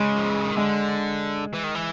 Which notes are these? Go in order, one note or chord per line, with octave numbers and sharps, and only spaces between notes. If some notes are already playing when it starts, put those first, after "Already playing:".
Already playing: C#3 G#3
F3
E3
D#3
D3 G#3
E3
D#3
E3